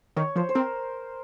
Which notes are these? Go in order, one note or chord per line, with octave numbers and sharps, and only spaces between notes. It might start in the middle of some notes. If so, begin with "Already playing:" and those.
D#3 C#5
F3 C5
C5
C4 A#4